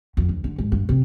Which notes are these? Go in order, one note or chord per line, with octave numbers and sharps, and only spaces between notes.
F2
D2
D3
G#2
G2
C3